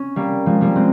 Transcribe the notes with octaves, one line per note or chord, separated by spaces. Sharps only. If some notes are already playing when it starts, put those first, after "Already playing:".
Already playing: C#4
G3 A#3
F3 G#3
G3 A#3
G#3 C4